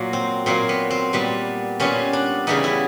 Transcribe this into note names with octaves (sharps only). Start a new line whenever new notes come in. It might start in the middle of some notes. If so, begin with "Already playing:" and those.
Already playing: A#2 F#3 A#3
C4
A#2 F#3 A#3 C4
B3
C4
A#2 G3 B3
A#2 G3 B3 C#4
D4
C#3 E3 G3 B3 D#4
E4